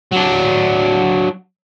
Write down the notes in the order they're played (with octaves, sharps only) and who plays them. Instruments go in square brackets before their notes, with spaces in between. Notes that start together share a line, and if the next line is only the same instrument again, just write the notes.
[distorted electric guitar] F#3 D4